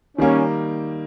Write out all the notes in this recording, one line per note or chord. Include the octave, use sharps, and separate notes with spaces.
D#3 G3 A#3 C#4